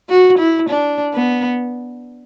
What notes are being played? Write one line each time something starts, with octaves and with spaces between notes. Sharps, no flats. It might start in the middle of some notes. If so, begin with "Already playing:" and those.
F#4
E4
D4
B3